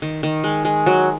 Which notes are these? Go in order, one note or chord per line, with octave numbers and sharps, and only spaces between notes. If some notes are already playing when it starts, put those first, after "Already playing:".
D#3
D#3
G#3
G#3
F#3